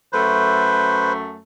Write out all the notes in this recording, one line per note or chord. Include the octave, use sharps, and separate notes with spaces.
F#2 A3 B4 C5